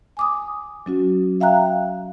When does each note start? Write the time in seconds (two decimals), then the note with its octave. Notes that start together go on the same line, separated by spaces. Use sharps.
0.17 G#5 D6 D#6
0.86 F#3 C#4 F#4
1.40 E5 F5 G5 A#5 F#6